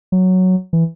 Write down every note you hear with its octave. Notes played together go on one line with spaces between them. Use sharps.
F#3
E3